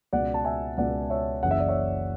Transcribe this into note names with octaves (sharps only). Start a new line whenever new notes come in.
C#2 B2 D5 F#5
A5
E5 G#5
C#2 B2 D5 F#5
C#5 E5
F#1 F#2 C#3 E3 F#5
E5
D5
C#5 E5